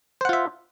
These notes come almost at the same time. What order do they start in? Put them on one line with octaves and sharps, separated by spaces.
C5 F#5 F4 E5